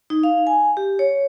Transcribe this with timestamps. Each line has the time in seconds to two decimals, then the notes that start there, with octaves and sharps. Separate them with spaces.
0.10 D#4
0.23 F5
0.47 G#5
0.77 G4
0.99 C#5